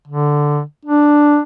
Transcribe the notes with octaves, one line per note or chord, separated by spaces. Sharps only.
D3
D4